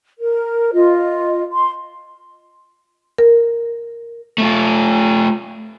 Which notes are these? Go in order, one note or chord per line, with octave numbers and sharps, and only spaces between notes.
A#4
F4 D#5
C6
A#4
A3 F4